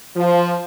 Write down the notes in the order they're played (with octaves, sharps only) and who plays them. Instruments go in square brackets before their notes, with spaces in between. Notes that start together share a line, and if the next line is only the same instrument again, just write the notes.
[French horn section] F3